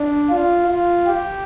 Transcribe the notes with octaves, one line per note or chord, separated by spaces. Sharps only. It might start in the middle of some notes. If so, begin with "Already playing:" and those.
Already playing: D4
F4
F4
G4